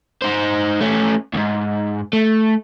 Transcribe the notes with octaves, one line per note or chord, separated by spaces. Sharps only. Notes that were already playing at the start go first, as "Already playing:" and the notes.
D#4 C5
A3 C#4
C#2 G#2
A3